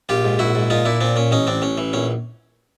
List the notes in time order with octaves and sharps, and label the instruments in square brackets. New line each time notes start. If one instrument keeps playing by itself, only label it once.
[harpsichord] A#1 F4 G4
G#2
A#1 E4 F#4
G#2
A#2 D#4 F4
A#2 D4 E4
A#2 C4 D4
A#2 C#4
A1 C#4 D#4
A1 C4 D4
A1 C#4
E3
A#1 C#4